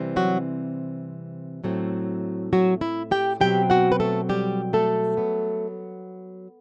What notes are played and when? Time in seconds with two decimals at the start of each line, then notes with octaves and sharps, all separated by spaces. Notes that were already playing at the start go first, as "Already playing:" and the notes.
Already playing: C3 E3 G3 C4
0.16 F#3 F#4
1.64 A2 F#3 A3 C4
2.53 F#3 F#4
2.81 E4 E5
3.11 G4 G5
3.40 B2 F#3 C4 G4 G5
3.70 F#4 F#5
3.92 B4
4.00 A3 A4
4.29 G3 G4
4.73 A3 A4
5.17 F#3 B3